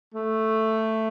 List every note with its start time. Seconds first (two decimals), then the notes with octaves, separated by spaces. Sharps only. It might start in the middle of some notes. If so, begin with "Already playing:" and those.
0.15 A3